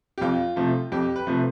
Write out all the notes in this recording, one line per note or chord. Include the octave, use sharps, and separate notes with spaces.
G4
F2 F4
C3 F3 A3
F2 G4
B4
C3 F3 A3 B4